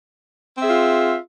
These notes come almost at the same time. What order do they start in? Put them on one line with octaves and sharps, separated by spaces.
C4 E5 G#4 F4